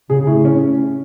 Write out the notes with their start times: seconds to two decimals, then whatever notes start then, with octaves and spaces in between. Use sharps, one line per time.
0.09 C#3 G#4
0.27 A2
0.45 C#4